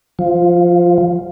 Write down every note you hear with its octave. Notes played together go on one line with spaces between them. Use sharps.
F3